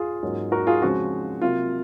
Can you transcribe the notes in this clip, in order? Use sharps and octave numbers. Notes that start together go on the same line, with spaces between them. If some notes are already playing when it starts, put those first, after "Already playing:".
Already playing: F4 G#4
G#2 F#3 A#3 C#4
F#4 A#4
F4 G#4
C#3 F3 G#3 C4 F#4
C3 F#3 A#3 F4